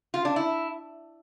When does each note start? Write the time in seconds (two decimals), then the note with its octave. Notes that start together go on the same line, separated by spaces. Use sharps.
0.14 F4
0.25 D4
0.36 E4